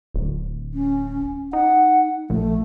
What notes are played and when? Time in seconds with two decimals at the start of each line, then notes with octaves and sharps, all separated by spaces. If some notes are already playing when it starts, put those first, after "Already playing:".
0.14 D1
0.74 C#4
1.53 D#4 F#5
2.30 A#1 A3